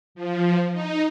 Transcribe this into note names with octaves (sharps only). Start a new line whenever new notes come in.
F3
D#4